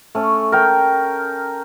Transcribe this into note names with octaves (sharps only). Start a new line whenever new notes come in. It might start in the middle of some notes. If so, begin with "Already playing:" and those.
A3 C#4
A#4 G5